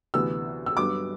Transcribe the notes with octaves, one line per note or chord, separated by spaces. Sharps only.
D2 C3 E3 B3 E6
E6
G2 F#3 B3 D6